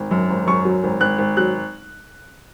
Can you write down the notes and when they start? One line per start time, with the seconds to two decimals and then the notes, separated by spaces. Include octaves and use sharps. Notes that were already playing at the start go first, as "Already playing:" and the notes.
Already playing: G#1
0.11 F#2
0.30 G#1
0.47 F#2 C#6
0.65 F#3
0.83 G#1
1.00 G#1 F#6
1.18 G#1
1.37 F#3 F#6